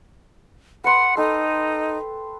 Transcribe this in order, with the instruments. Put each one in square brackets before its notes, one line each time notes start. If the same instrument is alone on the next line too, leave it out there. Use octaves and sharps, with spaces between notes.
[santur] B4 C6 [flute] F#5
[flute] D#4 [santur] A4 G5